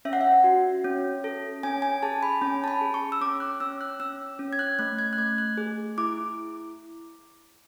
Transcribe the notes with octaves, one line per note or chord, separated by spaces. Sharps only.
C#4 E5
F#5
E5
F#4
C#4
A4
C#4 G#5
G#5
G#4 A5
B5
C#4 G#5
A5
B5
G#4
C#6
E6
C#4 D6
F#6
C#4 E6
F#6
C#4 E6
C#4
G#6
F#6
A3 F#6
G#6
F#6
A3 G#6
F#6
G#4
E4 D6